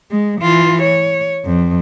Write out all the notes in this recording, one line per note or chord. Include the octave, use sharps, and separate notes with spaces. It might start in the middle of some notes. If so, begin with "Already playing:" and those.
G#3
E3 F4
C#5
F2